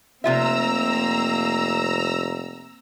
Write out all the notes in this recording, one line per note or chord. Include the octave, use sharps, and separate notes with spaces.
F1 C3 A#3 C4 F4 E5 A#5 E6